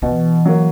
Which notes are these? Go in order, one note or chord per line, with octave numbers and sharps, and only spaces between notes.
B2 E3
F#3 A#3